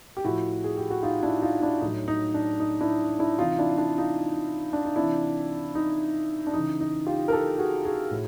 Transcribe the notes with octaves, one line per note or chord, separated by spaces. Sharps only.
G4
A2 F3 E4 F#4
G#4
G4
F#4
D#4 F4
D4 E4
D#4 F4
D4 E4
A2 F#3 D#4
D#4
D4
D#4
D4 E4
D4 E4
C3 E3 D#4 F4
D4 E4
D4 E4
D#4 F4
D4
D#4
C3 E3 D4 E4
D#4
D4
C#3 E3 D#4
D#4
F4 G4
A#4
G4 A4
F#4 G#4
F#4 G#4
A2